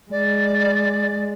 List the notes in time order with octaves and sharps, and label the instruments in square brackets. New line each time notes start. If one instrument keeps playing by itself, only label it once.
[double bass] G#3 [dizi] D5